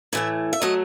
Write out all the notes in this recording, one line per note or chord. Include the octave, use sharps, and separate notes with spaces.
A2 E3 A3 E5
E5
F#3 A3 D#5